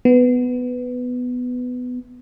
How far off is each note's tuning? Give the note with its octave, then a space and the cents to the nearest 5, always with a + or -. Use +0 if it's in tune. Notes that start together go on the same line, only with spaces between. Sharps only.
B3 +10